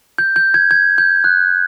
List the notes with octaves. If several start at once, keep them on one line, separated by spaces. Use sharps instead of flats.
G6
G6
G#6
G#6
G6
F#6